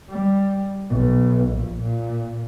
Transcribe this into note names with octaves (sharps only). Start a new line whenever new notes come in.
G3
B1
A#1
A#2